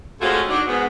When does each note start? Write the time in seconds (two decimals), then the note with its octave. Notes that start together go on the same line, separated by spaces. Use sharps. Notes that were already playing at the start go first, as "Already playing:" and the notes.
0.21 G#3 A3 C4 C#4 F4 F#4
0.48 F#3 D4 D#4
0.66 G#2 B3